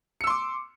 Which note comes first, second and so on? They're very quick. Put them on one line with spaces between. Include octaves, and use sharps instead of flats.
C#7 E6 C6 D6